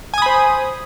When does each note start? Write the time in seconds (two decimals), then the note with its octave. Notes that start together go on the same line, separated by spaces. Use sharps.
0.14 G#5
0.18 D#6
0.22 B5
0.26 C5